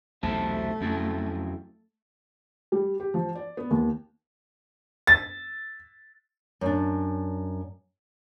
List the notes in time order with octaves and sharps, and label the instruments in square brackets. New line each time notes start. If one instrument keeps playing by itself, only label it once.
[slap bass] B1 E2 C3 [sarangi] A3 [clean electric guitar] C5 E5 A5
[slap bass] F2 [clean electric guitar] F#3 C#4 E4
[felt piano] G3
G4
F3
D5
B3
D#2
[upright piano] A6
[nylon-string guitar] F#2 D4